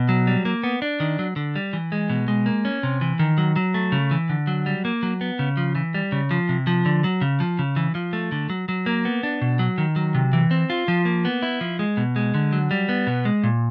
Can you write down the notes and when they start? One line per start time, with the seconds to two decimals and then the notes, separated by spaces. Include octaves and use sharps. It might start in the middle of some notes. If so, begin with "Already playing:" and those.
Already playing: B2
0.09 F#3
0.27 G3
0.45 A#3
0.64 B3
0.82 D4
1.00 D#3
1.19 F#3
1.36 D3
1.56 G3
1.73 E3
1.92 G#3
2.10 B2
2.28 G#3
2.46 A#3
2.65 C#4
2.83 C3
3.01 E3
3.19 D#3
3.38 F#3
3.56 F#3
3.74 A3
3.92 C#3
4.11 E3
4.29 D3
4.47 F#3
4.66 G3
4.85 A#3
5.03 F#3
5.21 B3
5.39 C#3
5.57 F3
5.75 E3
5.94 G3
6.12 C#3
6.31 F3
6.49 C3
6.67 F3
6.86 D3
7.04 F#3
7.21 C#3
7.40 F3
7.59 C#3
7.76 E3
7.95 F3
8.13 A3
8.32 D3
8.50 F#3
8.69 F#3
8.86 A#3
9.05 B3
9.23 D4
9.42 B2
9.59 F#3
9.78 D#3
9.96 F#3
10.15 C3
10.33 E3
10.51 C4
10.70 F4
10.88 F3
11.05 A#3
11.25 B3
11.42 E4
11.61 F3
11.79 G#3
11.97 B2
12.16 G#3
12.34 D3
12.53 F#3
12.71 G3
12.89 B3
13.07 B2
13.25 G#3
13.44 A#2